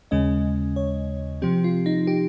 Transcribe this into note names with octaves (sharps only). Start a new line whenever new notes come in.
D#2 C#3 G#3 C#4 D#5
C#5
C3 F3 C4 G4
F4
D#4
G4